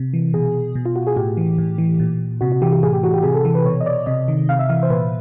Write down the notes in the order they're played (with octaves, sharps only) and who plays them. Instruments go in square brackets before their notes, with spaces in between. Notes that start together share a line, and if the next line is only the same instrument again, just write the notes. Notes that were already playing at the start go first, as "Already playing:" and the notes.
Already playing: [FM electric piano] C3
E3
B2 G#4
B2
F4
F#4
G#4
A2 G4
E3
A2
E3
A#2
C3 F#4
F#4
E3 G4
G4
A2 G#4
G4
E3 F#4
G4
C3 G#4
A4
E3 A4
B4
B2 C#5
D#5
D5
C3 D#5
D#3
C3 F5
E5
E3 F5
C5
A#2 B4